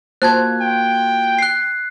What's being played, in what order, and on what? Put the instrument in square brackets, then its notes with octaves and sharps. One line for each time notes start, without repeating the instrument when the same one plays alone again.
[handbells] A#3 F4 F#4 [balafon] C5 A5 [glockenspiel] F#6 G#6
[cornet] G5
[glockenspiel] F#6 C7